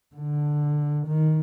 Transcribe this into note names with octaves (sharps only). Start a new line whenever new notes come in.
D3
D#3